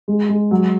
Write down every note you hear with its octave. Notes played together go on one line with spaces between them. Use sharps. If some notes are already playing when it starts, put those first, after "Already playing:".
G#3
G#3
F#3